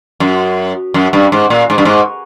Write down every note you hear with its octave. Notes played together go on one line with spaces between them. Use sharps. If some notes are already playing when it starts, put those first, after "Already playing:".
F#2
F#2
G2
G#2
A#2
G#2
G2
G#2